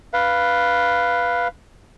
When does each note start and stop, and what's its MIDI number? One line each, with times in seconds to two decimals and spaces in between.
0.14 1.48 71
0.14 1.48 77